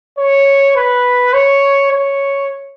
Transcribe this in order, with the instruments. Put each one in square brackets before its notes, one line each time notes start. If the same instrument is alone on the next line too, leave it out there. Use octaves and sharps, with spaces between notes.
[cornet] C#5
B4
C#5
C#5